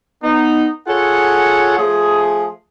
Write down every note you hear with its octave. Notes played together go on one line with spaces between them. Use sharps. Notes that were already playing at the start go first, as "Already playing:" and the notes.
B3 D#4
F4 G#4 A4 C#5 F#5
F3 A3 G#4